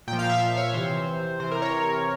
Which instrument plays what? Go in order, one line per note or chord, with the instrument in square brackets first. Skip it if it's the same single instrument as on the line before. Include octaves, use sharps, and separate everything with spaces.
[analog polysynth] A#2 G5
F3
F5
E5
F5
C#5
C3 E3 C5
C3 E3 C5
A#4
C#5